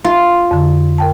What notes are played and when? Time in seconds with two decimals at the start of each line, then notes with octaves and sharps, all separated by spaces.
0.04 F4
0.51 F2 D3
0.98 A#4 G5 A5